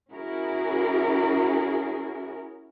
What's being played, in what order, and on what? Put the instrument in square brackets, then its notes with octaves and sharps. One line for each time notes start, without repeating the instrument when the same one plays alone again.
[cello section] C#4 E4 F#4 G#4 A#4